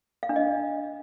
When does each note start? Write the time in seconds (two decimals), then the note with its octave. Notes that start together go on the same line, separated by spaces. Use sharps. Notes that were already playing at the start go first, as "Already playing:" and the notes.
0.23 F5
0.29 D4
0.36 D#5